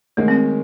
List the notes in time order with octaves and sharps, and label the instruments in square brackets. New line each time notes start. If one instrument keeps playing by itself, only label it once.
[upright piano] D#3 G#3 C#4 [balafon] A3
[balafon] C4